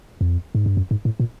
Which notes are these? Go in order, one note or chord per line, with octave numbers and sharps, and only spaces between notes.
F2
G#2
G2
F#2
G#2
A2
A#2